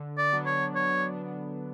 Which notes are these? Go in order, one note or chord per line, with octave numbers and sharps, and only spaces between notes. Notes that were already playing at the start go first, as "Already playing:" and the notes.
Already playing: D3
D5
F#3 B3 D4
C#5
D3 C#5
F#3 B3 D4